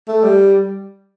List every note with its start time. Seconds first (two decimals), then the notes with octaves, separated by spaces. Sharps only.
0.08 A3
0.24 G3